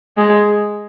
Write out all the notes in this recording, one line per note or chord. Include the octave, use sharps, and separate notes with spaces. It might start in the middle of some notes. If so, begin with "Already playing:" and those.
G#3